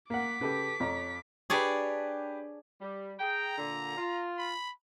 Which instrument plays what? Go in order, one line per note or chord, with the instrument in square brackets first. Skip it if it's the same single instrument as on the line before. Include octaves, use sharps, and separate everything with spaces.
[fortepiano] A#3 F#5 [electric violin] D6 B6
[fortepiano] C#3 [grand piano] G4 A4 B4
[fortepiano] F2 [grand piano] C#5 A#5
[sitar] D4 [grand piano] G4 B4 [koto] G#4 C#5 D5
[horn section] G3
[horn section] G#4 G5 [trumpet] A#5
[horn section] A#2 D3
F4
[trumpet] B5